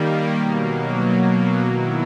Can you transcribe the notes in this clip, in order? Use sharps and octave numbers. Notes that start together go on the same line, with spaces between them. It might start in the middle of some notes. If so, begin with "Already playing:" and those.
Already playing: D#3 G3 A#3
B2 F#3 A#3
D#3 F#3 B3 E4